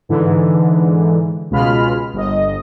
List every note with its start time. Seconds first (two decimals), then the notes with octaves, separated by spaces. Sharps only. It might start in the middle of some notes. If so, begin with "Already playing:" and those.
0.09 G#2 D3 E3
1.51 C#2 B2 G#3 F4 B5 F6
2.13 G1 D#5